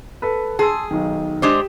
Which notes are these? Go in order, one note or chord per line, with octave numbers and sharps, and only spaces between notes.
A4 B4
G#4 A5 C6 E6
B1 D#3
G#3 D4 G4 C5 E7